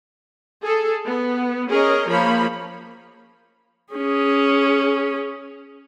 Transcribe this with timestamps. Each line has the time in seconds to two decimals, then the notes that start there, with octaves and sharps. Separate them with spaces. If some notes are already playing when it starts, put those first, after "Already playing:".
0.64 G#4 A4
1.05 B3
1.68 C#4 G#4 A#4 D#5
2.08 F3 A#3 C#5 B5
3.94 C#4 G#4